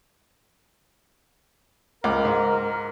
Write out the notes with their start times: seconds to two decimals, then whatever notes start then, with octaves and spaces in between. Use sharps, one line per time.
2.04 C#2 A#4 D6
2.25 G#2